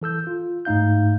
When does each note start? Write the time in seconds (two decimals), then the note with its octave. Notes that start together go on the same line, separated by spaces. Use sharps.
0.02 E3 A4 E6 G6
0.27 F4
0.65 G#2 A3 D#4 F5 G6